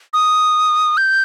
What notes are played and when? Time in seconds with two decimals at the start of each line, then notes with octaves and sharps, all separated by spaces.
0.14 D#6
0.97 G6